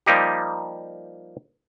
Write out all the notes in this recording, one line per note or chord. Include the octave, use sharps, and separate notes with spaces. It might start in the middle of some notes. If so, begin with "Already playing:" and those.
F3 G3 A#3 D#4 G4